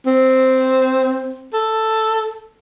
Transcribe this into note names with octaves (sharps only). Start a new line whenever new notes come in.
C4
A4